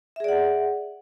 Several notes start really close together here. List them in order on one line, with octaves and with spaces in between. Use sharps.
E5 G#4 D5 F#5